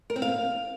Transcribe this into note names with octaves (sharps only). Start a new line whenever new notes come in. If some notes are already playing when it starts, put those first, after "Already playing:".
A#4
C4
F5